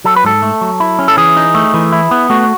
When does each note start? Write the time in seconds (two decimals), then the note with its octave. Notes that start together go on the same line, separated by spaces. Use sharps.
0.04 F#3 A4
0.16 B4
0.24 G#2 A4
0.42 A3
0.61 F#3
0.80 E4
0.99 C#4
1.08 A4
1.17 E3 G#4
1.37 D#4
1.54 A3
1.74 E3
1.92 E4
2.11 B3
2.30 A3 F#4